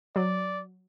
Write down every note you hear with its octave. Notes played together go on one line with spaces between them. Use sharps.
F#3 D5